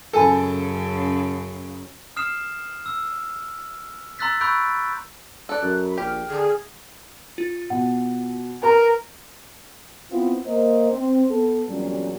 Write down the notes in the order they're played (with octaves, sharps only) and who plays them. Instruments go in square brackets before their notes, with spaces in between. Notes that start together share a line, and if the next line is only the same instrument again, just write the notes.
[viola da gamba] F#2 C#3 [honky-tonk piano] A4 [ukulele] C5 G#5 B5
[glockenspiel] D#6 F6 C7 E7
E6
A#5 C6 E6 F#6 A6 B6
B5 C#6 E6 F#6 G6 D7
[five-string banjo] A4 D5 [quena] F#6
[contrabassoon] F#2
[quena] B5
[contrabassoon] A#1 [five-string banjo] G4 [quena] F6
[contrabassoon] D3 [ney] G#4
[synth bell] F4
[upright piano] B2 [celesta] F#5
[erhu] A#4 [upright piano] B4 A#5
[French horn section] B3 C4 E4 F4
A#3 C5 D#5
C4
B3 A4
E2 G2 A#2 F#3 G3 C#4